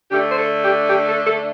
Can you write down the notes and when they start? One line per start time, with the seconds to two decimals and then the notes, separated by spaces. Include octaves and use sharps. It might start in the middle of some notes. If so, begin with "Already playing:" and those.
0.10 D3 A3 D4 G4
0.29 C5
0.36 A4
0.61 G4
0.87 G4
1.05 A4
1.25 A4